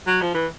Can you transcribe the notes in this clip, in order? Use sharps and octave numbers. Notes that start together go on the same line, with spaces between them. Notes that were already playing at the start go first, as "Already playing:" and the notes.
F#3
F3
E3